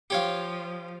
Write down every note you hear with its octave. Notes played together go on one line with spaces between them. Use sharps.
F3 G4 C#5 F5